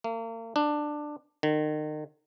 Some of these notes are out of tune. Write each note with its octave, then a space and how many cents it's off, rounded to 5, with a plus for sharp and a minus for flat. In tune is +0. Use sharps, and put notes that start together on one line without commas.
A#3 -40
D4 +15
D#3 -35